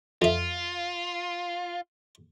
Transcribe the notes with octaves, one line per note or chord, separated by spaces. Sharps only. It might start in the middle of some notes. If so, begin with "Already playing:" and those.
F2 F4 E5